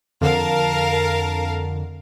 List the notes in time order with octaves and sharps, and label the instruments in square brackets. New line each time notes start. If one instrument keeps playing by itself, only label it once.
[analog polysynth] F2 D3 [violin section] A#4 F5 A5